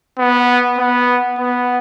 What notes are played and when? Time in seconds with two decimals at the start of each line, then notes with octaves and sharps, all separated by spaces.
0.18 B3
0.79 B3
1.39 B3